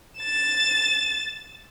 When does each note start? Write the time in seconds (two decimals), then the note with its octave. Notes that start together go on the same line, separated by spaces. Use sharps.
0.19 A6 E7